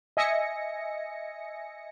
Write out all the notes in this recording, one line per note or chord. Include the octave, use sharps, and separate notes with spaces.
D#5 E5 G#5 A#6 C#7